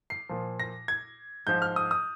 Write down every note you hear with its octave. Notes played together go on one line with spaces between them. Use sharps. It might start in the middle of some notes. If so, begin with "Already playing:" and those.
C7
A#2 F3
A#6
G#6
G#2 F3 G6
F6
D#6
D#6